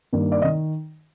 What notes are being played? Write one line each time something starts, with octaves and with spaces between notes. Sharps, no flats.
G2 D#3 A#3
D5
D#3 D#5